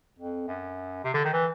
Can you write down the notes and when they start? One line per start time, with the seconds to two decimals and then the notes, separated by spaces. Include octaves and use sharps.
0.19 F2
0.48 F#2
1.05 C3
1.14 D3
1.25 D#3
1.33 E3